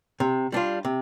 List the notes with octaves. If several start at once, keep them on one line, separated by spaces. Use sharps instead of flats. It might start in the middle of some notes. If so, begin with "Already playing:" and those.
C3
G3 D4 F4
C3